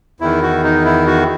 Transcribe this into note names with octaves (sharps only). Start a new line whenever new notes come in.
E2 D#3 E4
F#4
D#4
E4
F#4